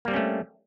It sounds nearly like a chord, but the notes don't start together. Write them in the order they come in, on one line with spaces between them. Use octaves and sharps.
A#3 G3 C4 C#4 A3